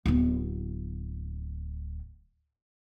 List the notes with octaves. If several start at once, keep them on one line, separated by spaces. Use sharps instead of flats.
D1 B3